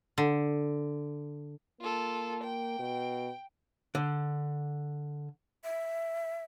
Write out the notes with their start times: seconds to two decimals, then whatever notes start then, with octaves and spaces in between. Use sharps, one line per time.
0.18 D3
1.81 A#3 F4 A4
2.43 G5
2.79 B2
3.95 D3
5.64 E5